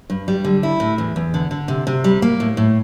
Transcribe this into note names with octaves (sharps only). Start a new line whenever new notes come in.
G2
G3
D3
E4
A2
E2
E2
D3
D3
C3
C3
G3
A#3
A2
A2